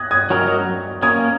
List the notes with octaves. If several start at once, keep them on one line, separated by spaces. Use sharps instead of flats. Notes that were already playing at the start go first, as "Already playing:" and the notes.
Already playing: D#6 F#6 G#6 A#6
D#6 G#6
F#3 C#4 F#4 A#4 D#5
A#3 C#4 A#4 D#6 G#6